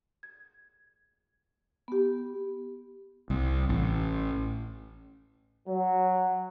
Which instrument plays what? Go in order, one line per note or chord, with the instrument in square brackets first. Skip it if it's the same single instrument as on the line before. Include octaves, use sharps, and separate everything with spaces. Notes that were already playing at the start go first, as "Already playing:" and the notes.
[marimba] G#6
B3 G4
[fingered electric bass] C2
A1
[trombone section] F#3